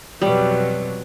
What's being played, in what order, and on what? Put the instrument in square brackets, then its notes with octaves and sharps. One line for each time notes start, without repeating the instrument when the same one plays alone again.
[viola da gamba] F2 B2 F#3 [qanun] G3